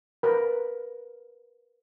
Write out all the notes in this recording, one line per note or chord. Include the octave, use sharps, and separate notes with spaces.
A#4 B4